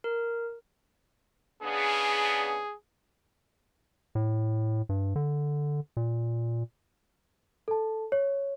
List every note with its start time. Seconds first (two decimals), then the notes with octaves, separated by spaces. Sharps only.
0.04 A#4
1.63 C#3 B3 D4 G#4
4.15 A2
4.89 G2
5.16 D3
5.97 A#2
7.68 A4 A5
8.12 C#5